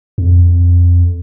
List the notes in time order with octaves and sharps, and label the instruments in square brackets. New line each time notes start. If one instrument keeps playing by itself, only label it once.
[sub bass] F2